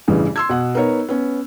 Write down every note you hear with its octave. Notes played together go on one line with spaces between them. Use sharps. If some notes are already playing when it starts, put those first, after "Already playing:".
A1 G2 C#3 E3
C6 E6 G#6
B2 F#5
B3 D#4 A#4 C#5
B3 C#4